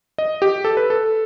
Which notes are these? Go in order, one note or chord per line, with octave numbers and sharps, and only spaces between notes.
D#5
G4
A4
B4
A4